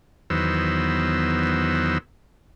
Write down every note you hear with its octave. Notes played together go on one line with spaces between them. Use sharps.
E2 D#3 F#3 B3 C5 E6